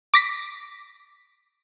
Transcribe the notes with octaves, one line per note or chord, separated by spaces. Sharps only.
D6 A#6 B6